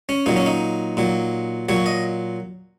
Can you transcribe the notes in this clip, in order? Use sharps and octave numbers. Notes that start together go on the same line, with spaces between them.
C#4
A#2 F#3 D#4
C#4
D#4
A#2 F#3
A#2 F#3 C#5
D#5